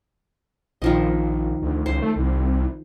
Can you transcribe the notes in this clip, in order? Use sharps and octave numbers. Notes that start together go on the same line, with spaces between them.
A#1 D#3 F3 D#5
D2
C#2 C5
A3
C2